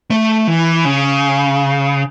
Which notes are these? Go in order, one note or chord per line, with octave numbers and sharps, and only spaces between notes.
A3
E3
C#3